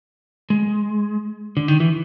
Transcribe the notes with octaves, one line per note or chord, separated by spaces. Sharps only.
G#3
D3
D#3
E3